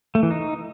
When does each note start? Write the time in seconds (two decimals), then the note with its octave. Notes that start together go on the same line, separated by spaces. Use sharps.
0.15 A3
0.23 E3
0.31 D#4